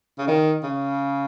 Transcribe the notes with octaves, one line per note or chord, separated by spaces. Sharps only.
C#3
D#3
C#3